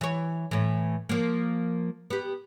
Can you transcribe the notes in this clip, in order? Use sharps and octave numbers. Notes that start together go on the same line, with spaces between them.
E3 C#5
A2 E3
F3 A#3
B3 G4